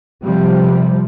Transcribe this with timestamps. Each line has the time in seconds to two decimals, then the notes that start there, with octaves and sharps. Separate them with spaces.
0.24 C3 F3 G3